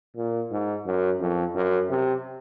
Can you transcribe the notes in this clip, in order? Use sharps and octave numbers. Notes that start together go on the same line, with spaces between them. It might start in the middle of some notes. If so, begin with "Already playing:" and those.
A#2
G#2
F#2
F2
F#2
C3